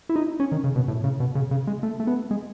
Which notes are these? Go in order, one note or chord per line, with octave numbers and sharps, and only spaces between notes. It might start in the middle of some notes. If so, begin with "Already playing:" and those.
E4
D#4
C#4
D#3
C#3
B2
A2
C#3
B2
C#3
C#3
G#3
A3
A3
B3
G#3